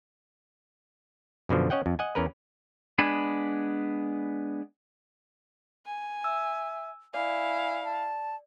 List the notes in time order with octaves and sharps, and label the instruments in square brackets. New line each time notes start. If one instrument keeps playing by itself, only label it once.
[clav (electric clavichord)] F#2 B2 D3 F3
C#4 C#5 D#5 F#5 G5
F2
D#5 F#5 G#5
E2 C#4 A#4 B4
[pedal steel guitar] G#3 B3 D4 G#5 B5
[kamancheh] G#5
[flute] E5 [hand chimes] E6
[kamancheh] E4 F5 [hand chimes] D5 [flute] G#5
[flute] A5